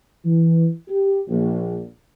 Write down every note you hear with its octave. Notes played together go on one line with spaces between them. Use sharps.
E3
G4
A#1